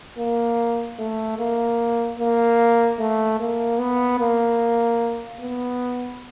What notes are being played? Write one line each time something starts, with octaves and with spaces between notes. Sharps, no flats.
A#3
A3
A#3
A#3
A3
A#3
B3
A#3
B3